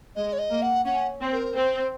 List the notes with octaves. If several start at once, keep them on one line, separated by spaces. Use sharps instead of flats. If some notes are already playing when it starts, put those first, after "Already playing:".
G#3 D#5
C#5
D#5
A#3
F#5
C#4 F#5
C4
A#4
C4 C5